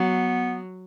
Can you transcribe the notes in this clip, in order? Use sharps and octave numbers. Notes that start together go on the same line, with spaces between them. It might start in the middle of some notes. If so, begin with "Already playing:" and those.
Already playing: F#3 B3